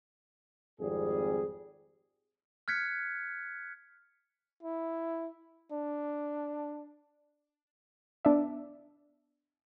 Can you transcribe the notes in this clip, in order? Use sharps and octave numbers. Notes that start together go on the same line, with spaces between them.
G#1 F2 G3 G#4
F6 F#6 G#6 B6 C#7
E4
D4
B3 D4 D5 E5